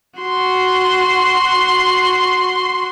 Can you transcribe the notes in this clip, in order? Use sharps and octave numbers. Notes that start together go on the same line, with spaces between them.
F#4 C6